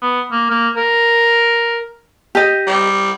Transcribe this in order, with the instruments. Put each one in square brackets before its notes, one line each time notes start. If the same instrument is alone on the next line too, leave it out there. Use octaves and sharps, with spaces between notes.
[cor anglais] B3
A#3
A#3
A#4
[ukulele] G4 D#5
[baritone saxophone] G3